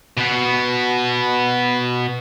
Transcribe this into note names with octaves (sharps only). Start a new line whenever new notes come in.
B2 B3